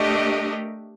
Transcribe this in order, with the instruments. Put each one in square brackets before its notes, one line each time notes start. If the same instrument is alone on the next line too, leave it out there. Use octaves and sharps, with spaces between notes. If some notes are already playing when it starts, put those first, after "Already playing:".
Already playing: [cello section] A3 D4 G4 A#4 D#5